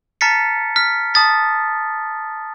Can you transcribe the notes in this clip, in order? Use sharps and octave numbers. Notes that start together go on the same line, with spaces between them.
A5 A#5 F6 A6 B6 C#7
F6 B6
A5 D#6 A6 B6